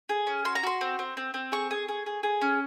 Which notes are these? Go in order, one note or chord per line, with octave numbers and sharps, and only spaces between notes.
G#4
C#4
F#4 C6
A#5
F#4 C6
C4
C4
C4
C4
G#4 C#6
G#4
G#4
G#4
G#4
C#4